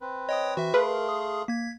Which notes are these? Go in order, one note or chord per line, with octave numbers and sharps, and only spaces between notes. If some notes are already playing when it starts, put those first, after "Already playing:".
C4 B4
C#5 D#5 G5 D#6
E3 F#4 E5
A3 G#4 A#4 B4 F5 C6
D#6
A#3 G#6 B6